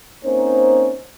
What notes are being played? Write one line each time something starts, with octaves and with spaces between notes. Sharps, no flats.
A#3 C4 C#4 D#4 C5